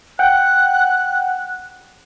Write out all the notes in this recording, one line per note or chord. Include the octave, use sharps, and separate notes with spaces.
F#5 G5 F#6